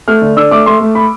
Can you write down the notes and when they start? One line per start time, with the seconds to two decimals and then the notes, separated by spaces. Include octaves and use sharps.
0.08 A3 F6
0.21 D3
0.36 D4 E6
0.51 A3 D6
0.66 A3 C6
0.80 A3
0.95 B5